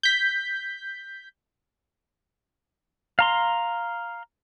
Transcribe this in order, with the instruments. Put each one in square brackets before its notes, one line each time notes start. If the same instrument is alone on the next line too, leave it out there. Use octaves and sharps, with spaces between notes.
[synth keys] G6 B6
[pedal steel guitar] F5 A#5 C6